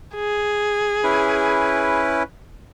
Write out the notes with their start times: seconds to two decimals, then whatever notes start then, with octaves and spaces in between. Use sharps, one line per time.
0.15 G#4
1.04 C#4 E4 B4